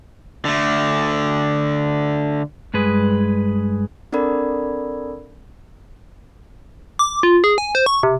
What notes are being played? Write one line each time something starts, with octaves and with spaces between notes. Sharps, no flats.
D3 A3
G2 G#3 G#4 B4
C4 D4 A4 A#4 D5 B5
D6
F4
G#4
G#5
C5
C#6
C3